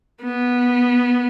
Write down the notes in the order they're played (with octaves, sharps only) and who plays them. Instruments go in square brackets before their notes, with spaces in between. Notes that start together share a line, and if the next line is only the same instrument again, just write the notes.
[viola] B3